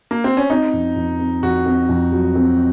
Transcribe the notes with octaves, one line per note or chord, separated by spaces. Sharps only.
A#3
C4
C#4
C4 D#4
F2
F2
C4
F2 F#4
C4
F2
F#3
C4